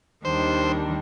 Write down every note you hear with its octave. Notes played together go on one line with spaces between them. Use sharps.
D#2 D#3 G3 D4 C5